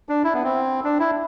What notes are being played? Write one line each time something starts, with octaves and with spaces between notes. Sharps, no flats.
D4
E4
B3
C4
D4
E4